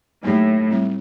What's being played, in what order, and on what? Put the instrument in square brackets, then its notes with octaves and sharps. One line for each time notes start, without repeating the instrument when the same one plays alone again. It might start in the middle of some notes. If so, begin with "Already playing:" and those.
[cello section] A2 [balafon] F#3 A#3 D#4 G4
[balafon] G3 C4 E4